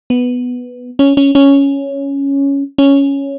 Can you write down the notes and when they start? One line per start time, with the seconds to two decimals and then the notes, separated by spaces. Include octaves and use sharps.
0.10 B3
0.99 C#4
1.17 C#4
1.35 C#4
2.78 C#4